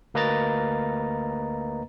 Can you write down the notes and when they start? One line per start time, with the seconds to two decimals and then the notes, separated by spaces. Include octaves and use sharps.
0.14 D2 A#3 B4 D#5 A#5 A6